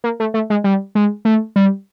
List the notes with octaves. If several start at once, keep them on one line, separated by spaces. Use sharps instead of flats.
A#3
A3
A3
G#3
G3
G#3
A3
G3